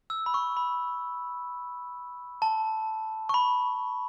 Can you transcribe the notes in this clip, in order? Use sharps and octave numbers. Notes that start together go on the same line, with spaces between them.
E6
B5
C#6
B5
A5
C#6
B5